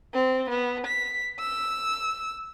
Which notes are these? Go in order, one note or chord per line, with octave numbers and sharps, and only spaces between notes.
C4
B3
B6
E6